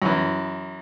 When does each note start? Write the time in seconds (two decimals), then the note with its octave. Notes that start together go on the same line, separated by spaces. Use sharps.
0.02 F#2 E3